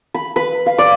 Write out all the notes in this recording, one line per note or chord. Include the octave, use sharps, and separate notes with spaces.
B5
B4
F5
D5